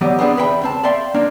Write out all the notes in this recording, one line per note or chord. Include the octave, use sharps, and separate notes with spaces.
E3 F#3 B3 G4 D5 D#5
B3 C4 D4 G#4
E2 B4 E5 G5 B5
C#2 C4 A5
D5 E5 F5 G5 C6
A#3 D4 D#4